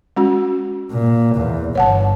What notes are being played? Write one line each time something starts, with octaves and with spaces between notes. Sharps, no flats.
G#3 C#4 F#4
A#2
E2
G1 C#5 F#5 A5